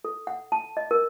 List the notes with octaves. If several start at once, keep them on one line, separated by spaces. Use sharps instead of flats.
A4
F#5
A5
D#5
A#4